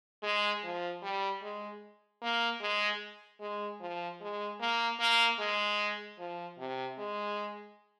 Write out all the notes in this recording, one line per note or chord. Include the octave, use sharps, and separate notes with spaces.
G#3
F3
G3
G#3
A#3
G#3
G#3
F3
G#3
A#3
A#3
G#3
F3
C3
G#3